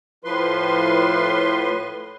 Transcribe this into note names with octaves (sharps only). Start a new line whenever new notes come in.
A2 F3 B4 C6